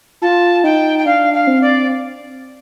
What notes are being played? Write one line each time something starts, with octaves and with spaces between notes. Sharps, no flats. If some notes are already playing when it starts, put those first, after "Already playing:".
F4 A5
D#4 G5
G5
D4 F5
F5
C4
D5